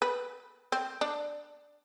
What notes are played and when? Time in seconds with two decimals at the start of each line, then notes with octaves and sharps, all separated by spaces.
0.02 B4
0.72 C4
1.01 D4